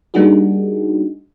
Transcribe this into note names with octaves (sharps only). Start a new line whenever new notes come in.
G3 A#3 D4 D#4 F#4 G#4